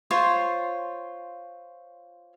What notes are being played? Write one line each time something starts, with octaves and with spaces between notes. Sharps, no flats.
F4 C5 C#5